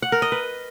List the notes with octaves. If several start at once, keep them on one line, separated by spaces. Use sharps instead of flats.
F#5
A#4
D#5
B4